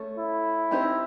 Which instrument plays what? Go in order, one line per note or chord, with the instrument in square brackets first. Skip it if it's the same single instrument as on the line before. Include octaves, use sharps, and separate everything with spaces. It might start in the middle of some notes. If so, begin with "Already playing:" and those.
Already playing: [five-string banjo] A3 C#4 A4
[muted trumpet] E4
[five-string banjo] C4 D#4 G4 C5